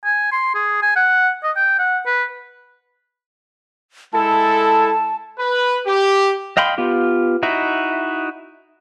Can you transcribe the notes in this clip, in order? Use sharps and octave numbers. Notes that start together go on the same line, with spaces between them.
G#5
C6
G#4
G#5
F#5
D#5
G5
F#5
B4
G#3 E4 A4 A5
B4
G4
D#5 F5 G5 B5 C6
B3 F4 G4
D#4 E4 F#4 E5